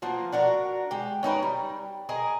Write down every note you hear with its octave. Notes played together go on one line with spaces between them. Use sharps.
F3 A#3 B3
D4 F#4 A#4
G#3 G4
C#4 D#4 A#4 B4
G3
G#4 A#4 D#5